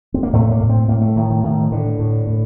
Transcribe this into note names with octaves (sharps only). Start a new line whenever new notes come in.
C4
A#3
A2 A3
A#3
A2
C4
A2 A#3
A3
A2 D#3
D#3
A2 D#3
A2 D3
A2
A2